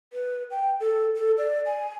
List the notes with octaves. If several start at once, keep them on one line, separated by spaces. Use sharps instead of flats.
B4
G5
A4
A4
D5
G#5